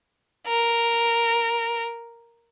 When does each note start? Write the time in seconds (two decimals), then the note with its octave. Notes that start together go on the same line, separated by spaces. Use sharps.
0.47 A#4